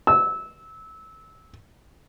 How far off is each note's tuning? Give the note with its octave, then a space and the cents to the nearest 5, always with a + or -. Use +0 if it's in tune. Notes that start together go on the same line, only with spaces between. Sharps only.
E6 -20